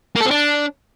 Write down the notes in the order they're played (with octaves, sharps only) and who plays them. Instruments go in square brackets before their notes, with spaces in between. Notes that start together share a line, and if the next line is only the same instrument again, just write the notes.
[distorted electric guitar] A#3
A4
C4
D4